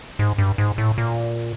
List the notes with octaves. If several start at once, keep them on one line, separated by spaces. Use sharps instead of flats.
G#2
G2
G#2
A2
A#2